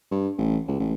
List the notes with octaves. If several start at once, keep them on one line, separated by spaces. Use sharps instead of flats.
G2
A1
C#2
A1